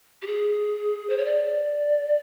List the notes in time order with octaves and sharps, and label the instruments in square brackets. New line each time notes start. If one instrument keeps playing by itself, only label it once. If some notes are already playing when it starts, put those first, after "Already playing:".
[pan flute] G4
G#4
C5
C#5
D5